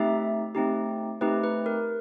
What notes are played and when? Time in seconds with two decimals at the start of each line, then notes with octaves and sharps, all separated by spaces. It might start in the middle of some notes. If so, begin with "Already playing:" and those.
Already playing: A3 C4 D#4 G4 E5
0.55 A3 C4 D#4 G4
1.21 A3 C4 D#4 G4 B4
1.44 B4
1.66 A#4